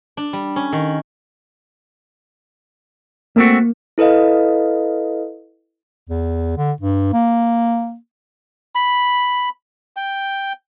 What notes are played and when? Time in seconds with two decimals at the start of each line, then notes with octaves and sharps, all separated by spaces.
0.17 D4
0.33 G3
0.56 C#4
0.73 D#3
3.36 A3 A#3 C4 F#4
3.98 E4 A4 B4 D#5 F5
6.10 E2
6.58 D3
6.81 G2
7.13 A#3
8.75 B5
9.96 G5